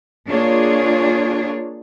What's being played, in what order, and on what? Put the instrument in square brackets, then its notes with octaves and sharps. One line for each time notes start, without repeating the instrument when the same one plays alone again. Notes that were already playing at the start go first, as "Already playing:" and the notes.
[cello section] A#3 D4 F4 G#4 C#5